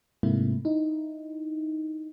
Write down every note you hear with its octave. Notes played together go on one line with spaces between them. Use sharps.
G#2 C3 A3 A#3 E4
D#4 E4